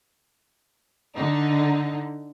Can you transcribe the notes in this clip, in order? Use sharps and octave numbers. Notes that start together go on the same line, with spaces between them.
D3 D#4